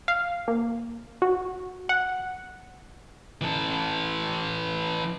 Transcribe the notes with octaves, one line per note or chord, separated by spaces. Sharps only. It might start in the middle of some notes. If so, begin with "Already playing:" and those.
F5
A#3
F#4
F#5
E3 A4